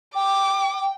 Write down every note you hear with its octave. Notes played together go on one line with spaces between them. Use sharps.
G5 D6